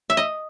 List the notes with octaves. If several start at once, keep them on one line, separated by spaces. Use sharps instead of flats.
E5
D#5